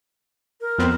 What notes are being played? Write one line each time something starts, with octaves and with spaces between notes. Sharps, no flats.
A#4
F2 B3 C4